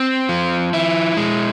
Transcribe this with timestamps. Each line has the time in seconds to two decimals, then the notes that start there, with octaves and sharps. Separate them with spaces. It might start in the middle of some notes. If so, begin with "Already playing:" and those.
Already playing: C4
0.29 F3
0.73 E4
1.17 G#3